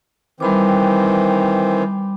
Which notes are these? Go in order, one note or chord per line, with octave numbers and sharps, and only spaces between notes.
D#3 E3 G3 C4 B5 D6